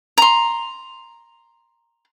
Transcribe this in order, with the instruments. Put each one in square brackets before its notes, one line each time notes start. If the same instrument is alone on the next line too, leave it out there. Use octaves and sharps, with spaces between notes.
[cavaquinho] A#5 C6